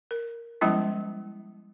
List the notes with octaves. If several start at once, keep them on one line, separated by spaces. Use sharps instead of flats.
A#4
F3 G3 G#3 B3 C#4 E4